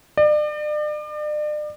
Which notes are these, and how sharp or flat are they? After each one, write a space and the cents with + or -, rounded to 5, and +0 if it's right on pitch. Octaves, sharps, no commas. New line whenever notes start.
D5 +40